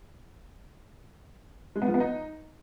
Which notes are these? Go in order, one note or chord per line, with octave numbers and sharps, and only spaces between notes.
G#3
B3
F3
B3
D#4